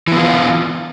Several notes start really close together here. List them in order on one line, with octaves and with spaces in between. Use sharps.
E3 B3 F4